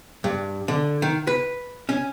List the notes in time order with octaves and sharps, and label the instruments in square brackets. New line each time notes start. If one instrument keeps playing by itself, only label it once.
[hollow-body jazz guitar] G2
D3
D#3
B4
C#4